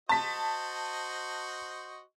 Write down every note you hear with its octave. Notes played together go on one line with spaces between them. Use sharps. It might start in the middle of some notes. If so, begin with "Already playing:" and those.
F#4 C5 D#5 A5 B6